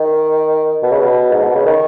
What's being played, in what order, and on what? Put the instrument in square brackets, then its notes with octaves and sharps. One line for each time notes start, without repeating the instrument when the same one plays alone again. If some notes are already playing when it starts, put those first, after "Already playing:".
Already playing: [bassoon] D#3
B2
C#3
B2
G#2
B2
C#3
D#3